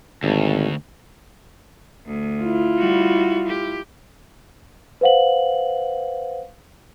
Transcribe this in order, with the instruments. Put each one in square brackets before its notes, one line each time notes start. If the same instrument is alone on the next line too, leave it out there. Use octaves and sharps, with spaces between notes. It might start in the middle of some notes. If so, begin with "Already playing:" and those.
[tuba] G#1 [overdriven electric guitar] D2
[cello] D2
[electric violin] E4 F4
[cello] G3 F#4
G4
[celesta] B4 C5 F5 F#5 F#7